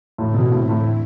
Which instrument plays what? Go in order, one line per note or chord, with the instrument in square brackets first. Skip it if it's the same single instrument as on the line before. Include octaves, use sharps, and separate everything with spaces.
[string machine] E2 D3 A3 C4 E4 [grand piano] A2
[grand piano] B2
A2
A2